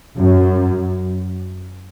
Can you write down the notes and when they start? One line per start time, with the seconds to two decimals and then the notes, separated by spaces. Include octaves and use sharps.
0.18 F#2